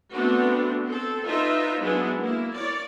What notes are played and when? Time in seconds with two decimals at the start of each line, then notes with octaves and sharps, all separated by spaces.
0.11 A3 B3 C4 D4 F#4
0.86 C4 A4
1.26 D#4 F4 B4 C5 E5
1.80 F#3 G#3 B3 D4 E4 G#4
2.20 A#3 E4
2.54 C#5 D5